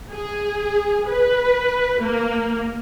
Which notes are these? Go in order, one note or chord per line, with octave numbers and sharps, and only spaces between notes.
G#4
B4
A#3